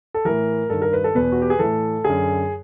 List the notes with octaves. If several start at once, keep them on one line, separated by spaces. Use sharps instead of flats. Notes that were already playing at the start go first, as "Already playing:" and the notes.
A4
A2 E3 A#4
G2 D#3 A4
A#4
B4
A4
E2 B2 B4
F#4
G4
G#4
A2 E3 A4
F#2 D3 G#4